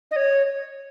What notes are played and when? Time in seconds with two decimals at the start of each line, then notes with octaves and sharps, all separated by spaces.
0.11 D#5
0.16 C#5